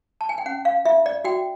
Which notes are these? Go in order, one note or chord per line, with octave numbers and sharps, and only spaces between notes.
A5
G#5
G5
C#4 F#5
F5
F4 E5
D5
F#4 G5